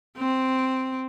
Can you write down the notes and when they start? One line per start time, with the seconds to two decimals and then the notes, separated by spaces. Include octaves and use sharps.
0.18 C4